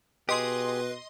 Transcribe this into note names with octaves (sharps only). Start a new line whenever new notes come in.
B2 G4 G#4 B4 D#5 C6